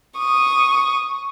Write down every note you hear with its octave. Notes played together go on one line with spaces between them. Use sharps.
C#6 D#6